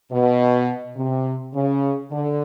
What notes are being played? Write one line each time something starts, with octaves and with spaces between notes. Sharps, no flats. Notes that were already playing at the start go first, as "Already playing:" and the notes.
B2
C3
C#3
D3